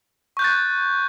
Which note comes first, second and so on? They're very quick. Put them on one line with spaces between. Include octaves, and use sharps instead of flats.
C#6 G6 F#6 A6